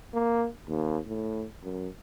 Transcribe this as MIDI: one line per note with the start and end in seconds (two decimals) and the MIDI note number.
0.14 0.47 58
0.67 0.98 39
1.07 1.45 45
1.63 1.88 42